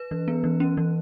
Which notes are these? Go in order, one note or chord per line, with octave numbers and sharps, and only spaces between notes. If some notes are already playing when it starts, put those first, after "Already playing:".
Already playing: B4
E3
B3
E3
C#4
E3